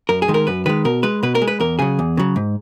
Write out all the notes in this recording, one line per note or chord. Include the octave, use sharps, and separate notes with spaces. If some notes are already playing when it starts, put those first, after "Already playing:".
F#2 A#4
G#4
D#3 G#3
A#4
F#2 B4
D#3 G#3 B4
B2 A#4
G#3 B4
B2 B4
A#4
G#3
B4
E2 A#4
C#3 F#3 G#4
E2
C#3 F#3
G#2